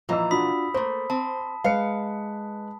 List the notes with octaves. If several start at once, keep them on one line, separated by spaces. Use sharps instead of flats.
A#2 E3 F3 D#5 A#5 E6
D4 F4 F#4 B5 D#6 B6
A3 A#3 C5
C4 A5
G#3 B4 F5 C#7